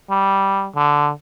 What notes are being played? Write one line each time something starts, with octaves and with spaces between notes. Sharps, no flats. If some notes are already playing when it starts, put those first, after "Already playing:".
G3
D3